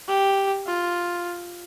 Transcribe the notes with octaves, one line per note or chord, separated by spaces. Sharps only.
G4
F4